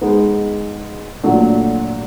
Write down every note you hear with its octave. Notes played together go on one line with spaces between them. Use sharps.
G#3 B3 D#4
A#2 F#3 A3 D4 F#4